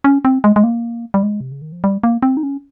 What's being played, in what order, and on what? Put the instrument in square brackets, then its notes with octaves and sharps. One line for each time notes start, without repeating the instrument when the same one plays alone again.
[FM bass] C#4
C4
G#3
G#3
A#3
G3
G#3
C3
C#3
D#3
F3
G3
A#3
C4
D#4
C#4